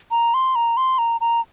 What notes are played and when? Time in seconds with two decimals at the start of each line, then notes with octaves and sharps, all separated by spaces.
0.11 A#5
0.34 C6
0.55 A#5
0.77 C6
0.98 A#5
1.21 A#5